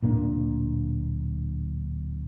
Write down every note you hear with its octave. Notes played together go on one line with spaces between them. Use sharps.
D1 A#2 A#3 D4